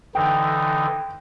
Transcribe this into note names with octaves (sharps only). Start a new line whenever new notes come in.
D3 E3 D#4 G5